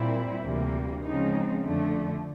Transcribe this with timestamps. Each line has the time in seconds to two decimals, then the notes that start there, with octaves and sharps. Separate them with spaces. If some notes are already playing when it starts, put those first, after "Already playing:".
Already playing: A#2 G3 C4 E4
0.45 D2 C3 E3 G3 A#3
1.03 C#3 F3 G#3 C4 D#4
1.62 F2 D3 F3 A3